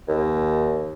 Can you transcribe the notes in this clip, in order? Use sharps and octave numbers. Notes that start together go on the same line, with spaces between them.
D#2